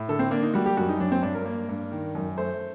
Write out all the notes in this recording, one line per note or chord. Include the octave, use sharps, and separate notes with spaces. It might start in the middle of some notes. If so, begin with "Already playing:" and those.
Already playing: A2
D3 A4
C4
A#3 D4
D#4
G3 F#4
G4
F#2 F#4
D#4
F#3 D4
C4
G2 D4
A#4
A#3
G2
D#3
F#2
A3 C5